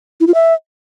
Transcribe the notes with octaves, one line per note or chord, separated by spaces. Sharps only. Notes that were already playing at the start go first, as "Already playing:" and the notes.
E4
F4
E5